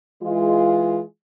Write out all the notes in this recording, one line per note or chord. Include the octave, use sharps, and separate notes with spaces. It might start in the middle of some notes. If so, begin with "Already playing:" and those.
E3 G#3 F4